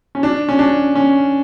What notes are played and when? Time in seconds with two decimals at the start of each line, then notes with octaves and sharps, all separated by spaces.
0.15 C#4
0.23 D4
0.49 C#4
0.59 D4
0.95 C#4